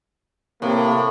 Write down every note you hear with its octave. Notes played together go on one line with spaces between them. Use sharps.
A2 C3 A#3